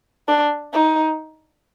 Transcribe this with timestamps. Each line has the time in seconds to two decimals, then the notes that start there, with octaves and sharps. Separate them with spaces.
0.28 D4
0.73 D#4